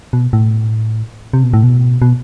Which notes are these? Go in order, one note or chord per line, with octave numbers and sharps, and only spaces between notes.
B2
A2
C3
B2
A2
B2
B2